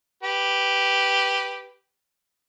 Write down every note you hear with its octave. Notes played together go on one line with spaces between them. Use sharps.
G4 B4